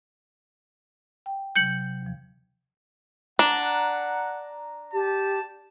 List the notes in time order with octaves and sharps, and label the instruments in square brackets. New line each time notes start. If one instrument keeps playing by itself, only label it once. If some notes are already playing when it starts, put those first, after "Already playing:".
[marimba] G5
[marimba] C3 F#3 [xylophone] G6 C#7 F#7
[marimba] D#2 F3
[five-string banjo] D4 [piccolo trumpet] F#5 [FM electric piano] A#5
[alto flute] G4 [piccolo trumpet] A5